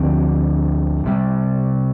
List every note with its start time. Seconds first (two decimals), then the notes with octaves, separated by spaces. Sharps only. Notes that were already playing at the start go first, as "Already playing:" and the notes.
Already playing: D2 D3 F3 C4
1.04 C2 C3 G3